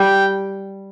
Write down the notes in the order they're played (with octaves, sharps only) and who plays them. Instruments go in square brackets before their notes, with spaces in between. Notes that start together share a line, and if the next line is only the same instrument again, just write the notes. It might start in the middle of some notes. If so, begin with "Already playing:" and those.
Already playing: [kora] G3 [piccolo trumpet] G5